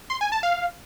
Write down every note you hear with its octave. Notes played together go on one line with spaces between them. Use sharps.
C6
G#5
A5
F5